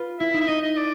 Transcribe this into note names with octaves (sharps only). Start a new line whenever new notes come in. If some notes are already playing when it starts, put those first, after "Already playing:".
Already playing: F4 B4
E4 E5
D#4
E5
D#4 D#5
D#5
D5